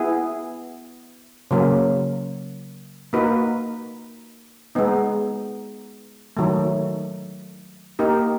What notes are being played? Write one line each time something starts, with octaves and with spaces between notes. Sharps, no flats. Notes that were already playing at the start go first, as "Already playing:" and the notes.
Already playing: B3 E4 G#4
C#3 F#3 A#3
A#3 D#4 F#4 B4
G#3 B3 D#4
D#3 F#3 A3
A#3 D#4 G4 A#4